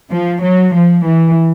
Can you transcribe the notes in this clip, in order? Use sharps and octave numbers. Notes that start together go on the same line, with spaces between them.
F3
F#3
F3
E3